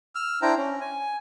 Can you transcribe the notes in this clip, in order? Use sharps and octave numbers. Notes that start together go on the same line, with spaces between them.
E6 F6
D4 E4 C5 G5 A#5
C#4
G#5